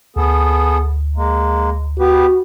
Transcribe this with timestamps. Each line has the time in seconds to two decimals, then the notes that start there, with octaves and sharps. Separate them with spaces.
0.16 D2 B3 G#4 A4
1.16 G#3 A#3
1.99 B3 F#4 G4 B4